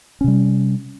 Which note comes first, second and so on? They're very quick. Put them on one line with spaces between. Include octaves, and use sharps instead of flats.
C#4 C3 G3